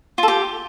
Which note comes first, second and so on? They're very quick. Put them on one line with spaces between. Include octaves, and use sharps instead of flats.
F4 A4 G4